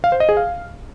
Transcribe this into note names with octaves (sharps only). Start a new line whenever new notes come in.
F5
C5
D#5
G#4
F5